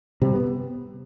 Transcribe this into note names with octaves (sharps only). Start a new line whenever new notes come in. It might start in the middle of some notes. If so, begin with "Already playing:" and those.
C3 G3
B3